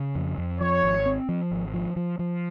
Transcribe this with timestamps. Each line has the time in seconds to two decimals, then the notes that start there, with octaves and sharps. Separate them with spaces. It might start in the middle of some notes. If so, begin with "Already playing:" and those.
Already playing: C#3
0.15 F2
0.38 F2
0.60 F3 C#5
0.83 G#1
1.06 C4
1.29 F3
1.51 G#1
1.74 F3
1.96 F3
2.19 F3